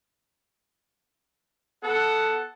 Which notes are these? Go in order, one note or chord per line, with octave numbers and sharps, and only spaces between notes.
B3 A4 F#5 A5